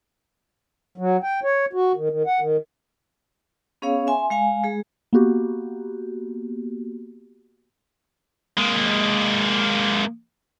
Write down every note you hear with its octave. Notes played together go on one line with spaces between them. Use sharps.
F#3
G5
C#5
F#4
D#3
D#3
F#5
D#3
B3 C#4 G#4 C#5 F5
E5 G#5 C6
G#3 F5 G#5
G#3 G#4
A#3 B3 F#4 G4
G#3 A#3